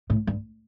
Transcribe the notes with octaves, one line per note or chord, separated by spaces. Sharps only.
A2
G2